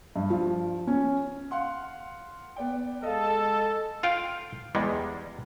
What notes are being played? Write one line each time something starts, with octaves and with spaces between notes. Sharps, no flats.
G2
F3
C#4
F5 F#5 C6
B3 D5 G5
G#3 A4 D#5 F5
F4 F5 G5
E2 G3 G#3